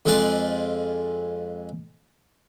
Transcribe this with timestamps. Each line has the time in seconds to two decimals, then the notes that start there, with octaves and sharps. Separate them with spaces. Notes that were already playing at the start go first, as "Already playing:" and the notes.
0.06 F2 F3 G#3 B4 D5 C6